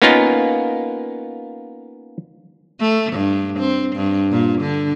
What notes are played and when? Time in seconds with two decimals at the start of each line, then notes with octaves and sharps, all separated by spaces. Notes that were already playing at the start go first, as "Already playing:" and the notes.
0.02 A#3 B3 C#4 D#4 F4 A#4
2.80 A3
3.13 G2
3.59 C4
3.96 G2
4.31 A#2
4.61 D3